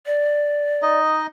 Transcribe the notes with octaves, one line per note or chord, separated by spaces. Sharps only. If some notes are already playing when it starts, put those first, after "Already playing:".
D5
D#4 D#5